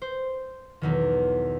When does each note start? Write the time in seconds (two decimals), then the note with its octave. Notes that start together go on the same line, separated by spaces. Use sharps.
0.02 C5
0.81 B1 E2 D#3